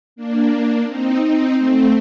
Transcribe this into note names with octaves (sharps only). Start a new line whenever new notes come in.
A#3 D4
C4 D#4
C4 D#4
A3 C4